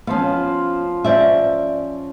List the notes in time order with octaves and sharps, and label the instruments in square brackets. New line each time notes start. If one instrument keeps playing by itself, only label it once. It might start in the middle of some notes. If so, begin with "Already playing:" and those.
[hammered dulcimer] F3 C5 F5 [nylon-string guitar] B3 C#4
[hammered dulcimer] C#4 [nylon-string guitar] C5 D5 E5